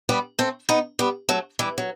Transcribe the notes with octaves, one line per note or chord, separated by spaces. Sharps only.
G3 B3
A3 C4
B3 D#4
G3 B3
F#3 A3
E3 G3
F#3